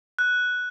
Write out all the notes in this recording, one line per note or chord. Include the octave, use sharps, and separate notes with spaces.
F#6